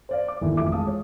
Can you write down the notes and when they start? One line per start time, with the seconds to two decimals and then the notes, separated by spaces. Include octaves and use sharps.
0.09 C5 D5 F5
0.28 D6
0.41 G1 D#2 E3
0.57 A1 F2 F3 E5 D6
0.72 G#3 F5 A5 D#6
0.87 C#5